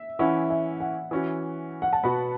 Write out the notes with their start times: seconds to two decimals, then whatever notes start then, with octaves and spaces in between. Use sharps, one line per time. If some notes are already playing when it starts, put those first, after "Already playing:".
Already playing: E5
0.19 E3 C#4 E4 F#5
0.50 E5
0.80 F#5
1.11 E3 C#4 F#4
1.82 F#5
1.93 A5
2.04 B2 B3 F#4 B5